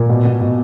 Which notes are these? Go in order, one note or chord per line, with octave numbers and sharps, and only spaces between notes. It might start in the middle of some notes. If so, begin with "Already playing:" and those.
Already playing: A#2 A#3 A#4
B2
B2
B2